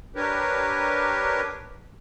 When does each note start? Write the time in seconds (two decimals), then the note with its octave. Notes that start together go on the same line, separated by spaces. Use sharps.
0.16 D4 G4 A#4 B4 C#5